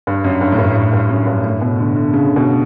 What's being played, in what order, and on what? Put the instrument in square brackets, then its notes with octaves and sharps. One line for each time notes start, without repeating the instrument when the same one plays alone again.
[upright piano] G2
F#2
G2
A2
G2
A2
G2
F#2
G2
A2
B2
D3
D3
C#3
B2